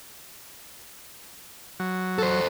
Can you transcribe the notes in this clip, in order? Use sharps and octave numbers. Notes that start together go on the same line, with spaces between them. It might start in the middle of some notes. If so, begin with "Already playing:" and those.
F#3
A4 C5